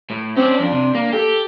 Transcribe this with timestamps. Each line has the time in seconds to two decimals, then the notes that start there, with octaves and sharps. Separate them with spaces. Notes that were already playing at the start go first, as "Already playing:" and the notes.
0.10 A2
0.37 C4 C#4 D5
0.59 F2 D4
0.72 C3
0.95 A#3
1.12 G4 A4